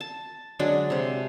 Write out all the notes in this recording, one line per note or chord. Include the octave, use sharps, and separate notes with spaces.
A5
D3 F#3 G#3 D4
C3 C5